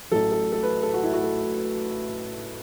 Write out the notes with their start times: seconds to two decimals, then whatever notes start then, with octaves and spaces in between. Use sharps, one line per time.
0.12 A1 A2 F#3 A4
0.32 A4
0.52 A4
0.63 B4
0.83 A4
0.94 F#4
1.03 E4
1.13 F#4
1.23 A4